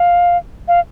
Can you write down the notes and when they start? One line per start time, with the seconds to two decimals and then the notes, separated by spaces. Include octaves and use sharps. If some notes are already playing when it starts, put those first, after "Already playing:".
Already playing: F5
0.68 F5